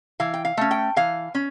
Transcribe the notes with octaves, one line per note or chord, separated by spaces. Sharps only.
E3 F5
G5
F5
A3 C#4
G5
E3 F5
C#4